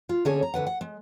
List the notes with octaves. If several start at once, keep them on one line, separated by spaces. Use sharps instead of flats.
F4
D3 A#3 C#4 G#4 A4 C#5
A#5
D2 D3 B4 F#5
F#5
G#3